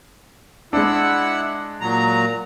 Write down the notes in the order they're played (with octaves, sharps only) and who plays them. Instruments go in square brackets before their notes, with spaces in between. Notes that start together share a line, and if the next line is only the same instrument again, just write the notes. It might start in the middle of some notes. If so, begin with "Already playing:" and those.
[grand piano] G#3 D4 [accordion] E4 F#5 E6
[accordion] A#2 F#3 A#5